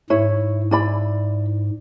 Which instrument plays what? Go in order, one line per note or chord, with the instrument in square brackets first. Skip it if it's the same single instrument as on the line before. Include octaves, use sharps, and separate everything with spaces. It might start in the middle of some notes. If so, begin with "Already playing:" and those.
[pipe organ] G#2 [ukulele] E4 C#5
[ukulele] E4 D5 B5